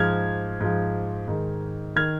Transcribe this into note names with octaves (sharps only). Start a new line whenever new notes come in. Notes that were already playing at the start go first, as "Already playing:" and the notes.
Already playing: G#2 F3 F6 G#6
G#2 F3
G#2 D#3
D#3 F6 G#6